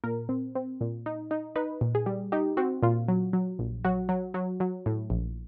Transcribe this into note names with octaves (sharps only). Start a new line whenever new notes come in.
A#2 A#4
C4
C4
A#2
D#4
D#4
D#4 B4
A#2
G#4
G3
D#4 G4
C4 F#4
A#2 F4
F#3
F#3
A#1
F#3 F#4
F#3
F#3
F#3
A2
A#1